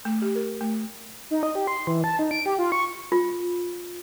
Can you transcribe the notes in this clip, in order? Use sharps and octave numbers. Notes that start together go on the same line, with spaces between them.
A3
G4
A#4
A3
D#4
D#5
G4
C6
E3
A5
D#4
D7
G4
F4
C#6
F4